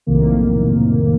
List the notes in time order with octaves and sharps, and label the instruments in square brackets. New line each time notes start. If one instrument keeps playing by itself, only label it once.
[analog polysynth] B1 F2 A2 C3 D#3 A#3